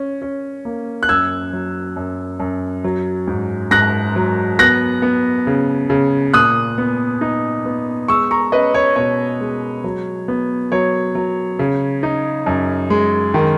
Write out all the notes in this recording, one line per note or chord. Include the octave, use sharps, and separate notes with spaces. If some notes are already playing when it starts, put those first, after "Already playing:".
Already playing: C#4
C#4
A#3
F#6
F#2 E6 G#6
F#3
F#2
F#2
F#3
G#2
G#2 F#6 A#6
F#3
B3 F#6 A#6
B3
C#3
C#3
A#2 D#6 F#6
B3
D#4
B3
G#3 C#6 E6
A#5 C#6
C#4 B4 D#5
C#5
B2 C#5
G#3
F#3
B3
F#3 C#5
F#3
C#3
D#4
F#2
G#3
D#3